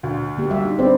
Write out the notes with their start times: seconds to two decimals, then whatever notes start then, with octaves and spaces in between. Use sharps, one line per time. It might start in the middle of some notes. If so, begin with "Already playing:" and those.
0.03 D2
0.37 D3 A#3 G4
0.51 G3 E5
0.65 D#4
0.79 C4 D4 B4 D5